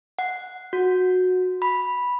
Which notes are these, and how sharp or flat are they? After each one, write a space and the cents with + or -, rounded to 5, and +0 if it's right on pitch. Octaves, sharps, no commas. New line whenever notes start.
F#5 -5
F#4 -15
B5 -5